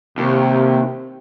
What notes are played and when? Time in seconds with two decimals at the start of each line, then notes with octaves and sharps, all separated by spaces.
0.18 D#2 C3